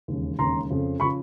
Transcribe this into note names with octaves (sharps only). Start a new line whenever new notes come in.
E1 D#2 C#3
E1 D#2 C#3 A#5 C6
F2 C#3 F3
C#3 F3 B5 C#6